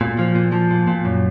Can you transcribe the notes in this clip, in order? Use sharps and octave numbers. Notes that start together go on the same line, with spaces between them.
A#2
F3
A#2
F3
A#2
A#2
F#2